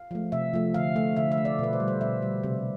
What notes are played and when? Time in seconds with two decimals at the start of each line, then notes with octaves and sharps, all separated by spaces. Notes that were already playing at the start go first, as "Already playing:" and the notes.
Already playing: F5
0.11 F3 A3
0.32 C3 E5
0.53 F3 A3
0.74 D3 F5
0.96 A3
1.16 D3 E5
1.32 E5
1.37 A3
1.45 D5
1.59 B2 B4
1.73 C5
1.80 G3
1.88 C5
2.01 B2 E5
2.22 G3
2.43 C3